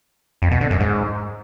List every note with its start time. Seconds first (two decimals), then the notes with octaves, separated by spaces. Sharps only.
0.42 F2
0.51 B2
0.61 D3
0.70 F#2
0.80 G#2